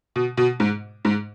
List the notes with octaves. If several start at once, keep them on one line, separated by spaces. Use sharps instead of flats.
B2
B2
G#2
G#2